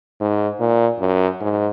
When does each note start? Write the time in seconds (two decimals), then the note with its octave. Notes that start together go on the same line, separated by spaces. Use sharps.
0.21 G#2
0.60 A#2
1.00 F#2
1.41 G#2